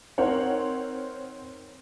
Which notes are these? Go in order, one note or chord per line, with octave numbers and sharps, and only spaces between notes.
C4 D#4 A#4 C5 C#5 F#5